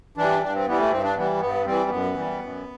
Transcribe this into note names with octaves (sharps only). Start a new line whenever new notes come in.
E3 G3 D4
G2 D4
C4
E3 G3 B3
A3
G2 C4
D4
E3 G3 B3
G2 B3
E3 G3 C4
F#2 B3
E3 G3
F#2